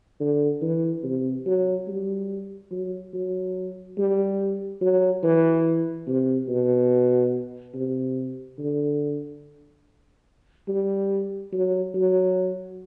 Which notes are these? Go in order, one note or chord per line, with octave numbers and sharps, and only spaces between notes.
D3
E3
C3
F#3
G3
F#3
F#3
G3
F#3
E3
C3
B2
C3
D3
G3
F#3
F#3